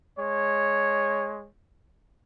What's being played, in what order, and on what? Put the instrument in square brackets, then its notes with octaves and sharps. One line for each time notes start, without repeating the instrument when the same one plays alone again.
[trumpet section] G#3 C#5